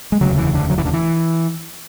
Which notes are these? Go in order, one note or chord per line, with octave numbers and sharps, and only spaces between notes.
G#3
E1 D2 C#3 F#3
E3
D3
F#3
E3
D3
E3